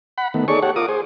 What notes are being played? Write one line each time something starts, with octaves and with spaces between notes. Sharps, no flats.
F#5 B5
D#3 A3 B3
D#4 G#4 A4 C#5 D5 C#6
G4 A4 C#5 F#5
F4 A#4 D6 D#6
G#4 C5